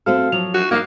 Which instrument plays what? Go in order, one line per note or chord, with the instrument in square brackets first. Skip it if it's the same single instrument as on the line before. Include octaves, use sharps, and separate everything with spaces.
[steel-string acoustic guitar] A3 C4 A4 [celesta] F#4 F5 F6
[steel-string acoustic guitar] F3 F#3 [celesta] F7
[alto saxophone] F#4
[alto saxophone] A#3 [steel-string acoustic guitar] D#4 D#5 F5